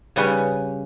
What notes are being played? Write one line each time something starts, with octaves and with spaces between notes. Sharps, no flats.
C#3 G3 C#4 B4